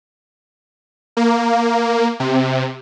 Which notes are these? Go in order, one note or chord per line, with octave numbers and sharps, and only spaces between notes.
A#3
C3